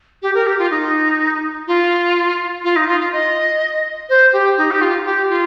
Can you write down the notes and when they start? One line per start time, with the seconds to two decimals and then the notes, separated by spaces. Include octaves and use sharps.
0.22 G4
0.35 A#4
0.47 G4
0.59 F4
0.71 D#4
1.67 F4
2.64 F4
2.76 D#4
2.88 F4
3.00 F4
3.12 D#5
4.09 C5
4.33 G4
4.57 D#4
4.71 G4
4.81 F4
5.05 G4
5.30 F4